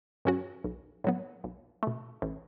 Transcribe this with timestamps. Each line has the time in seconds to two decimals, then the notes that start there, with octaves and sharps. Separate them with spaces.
0.25 G2 F#3 C#4 F#4
0.64 B1
1.04 A2 F#3 B3
1.44 B1
1.83 B2 A3
2.22 A1